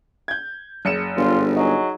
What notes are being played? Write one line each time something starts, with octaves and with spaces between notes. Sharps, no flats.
G6 G#6
F#1 C#7 E7
G1 F4
F#3 D#4 G#4